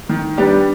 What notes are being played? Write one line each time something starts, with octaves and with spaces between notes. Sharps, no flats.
D#3
G3 B3 D4 G4